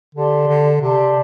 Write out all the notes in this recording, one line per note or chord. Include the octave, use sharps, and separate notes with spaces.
D3 G4 D5 A5 C6
D3
C3 G4 D5 A5 C6